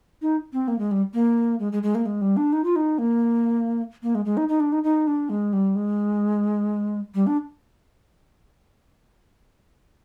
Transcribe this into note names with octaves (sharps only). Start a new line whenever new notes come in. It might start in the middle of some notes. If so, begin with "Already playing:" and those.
D#4
C4
A#3
G#3
G3
A#3
G#3
G#3
G#3
A#3
G#3
G3
D4
D#4
F4
D#4
A#3
A#3
G#3
G#3
D#4
D#4
D4
D#4
D#4
D4
G#3
G3
G#3
G3
D4